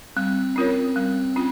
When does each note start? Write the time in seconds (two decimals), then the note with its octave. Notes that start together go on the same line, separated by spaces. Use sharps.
0.16 G3 C4
0.56 C#4 F4 A#4 C#5
0.96 G3
1.36 C#4 F4